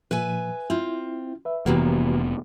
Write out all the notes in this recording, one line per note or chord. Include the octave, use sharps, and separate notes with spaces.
A#2 F3 B4 E5 G#5
C4 E4 F4
B4 E5
F1 C3 E3 A#3 B3 F#4 G4 B4